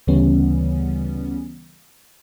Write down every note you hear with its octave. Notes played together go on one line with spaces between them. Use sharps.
D2 C#3 E3 G3 B3 C#4